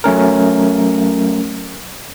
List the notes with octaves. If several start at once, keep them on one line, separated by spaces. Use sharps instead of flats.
F#3 A3 C#4 A#4